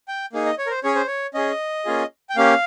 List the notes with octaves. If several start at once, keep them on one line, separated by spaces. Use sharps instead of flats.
G5
A#3 D#4 G#4
D#5
C#5
A#4
C5
C#4 G#4 C#5
C5
C#5
C#4 G#4 D#5
A#3 C#4 F4 G#4
G5
A#3 C#4 G4 F5